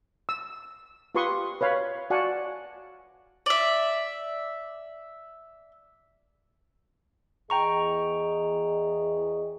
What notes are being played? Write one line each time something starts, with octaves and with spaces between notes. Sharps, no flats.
E6
F4 G4 B4 C6 C#6 D#6
B4 C#5 F5 B5
F#4 D5 F5 F#5 G#5 A5
D5 E5
E2 G#4 D#5 G5 A#5 C#6